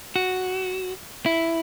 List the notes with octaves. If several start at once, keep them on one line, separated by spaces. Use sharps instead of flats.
F#4
E4